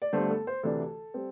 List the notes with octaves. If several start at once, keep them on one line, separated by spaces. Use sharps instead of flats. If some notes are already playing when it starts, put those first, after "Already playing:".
D5
G1 G2 D3 A3 D4 C5
A4
C5
D2 C3 E3 A3 D4 A4
G3 C4